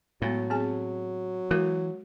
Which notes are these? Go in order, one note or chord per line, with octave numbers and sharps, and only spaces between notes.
A2 F#3 G#3 B3
C4 G#4 G#5
E3 G#3 F#4 A#4